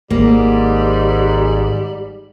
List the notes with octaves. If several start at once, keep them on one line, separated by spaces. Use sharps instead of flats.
G#1 G#2 G3 A#3